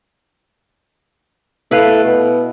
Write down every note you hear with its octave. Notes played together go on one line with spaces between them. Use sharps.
A3 E4 B4 F5
B2